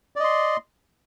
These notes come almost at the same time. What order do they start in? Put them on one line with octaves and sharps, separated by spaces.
D5 D#5 C6